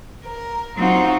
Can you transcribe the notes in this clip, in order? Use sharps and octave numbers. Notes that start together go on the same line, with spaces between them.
A#4
F#3 C4 D#4 F4 F#4